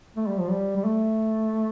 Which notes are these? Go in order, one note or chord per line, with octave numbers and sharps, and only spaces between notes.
A3
G3
F3
G3
G3
A3